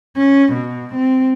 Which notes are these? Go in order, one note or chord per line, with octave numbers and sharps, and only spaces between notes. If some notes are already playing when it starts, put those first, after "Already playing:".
C#4
B2
C4